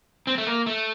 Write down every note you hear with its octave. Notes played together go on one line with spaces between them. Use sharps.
C4
A3
A#3
A3